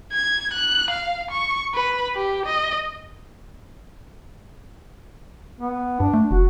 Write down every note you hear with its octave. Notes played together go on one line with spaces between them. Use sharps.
G#6
F#6
F5
C#6
B4
G4
D#5
B3
G2 D4
A3
F1 F#4